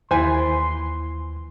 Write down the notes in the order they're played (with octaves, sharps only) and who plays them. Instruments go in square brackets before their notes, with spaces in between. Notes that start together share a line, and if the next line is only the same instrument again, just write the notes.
[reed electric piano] D#2 [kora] E3 F4 B4 [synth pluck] C5 G#5 [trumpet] C6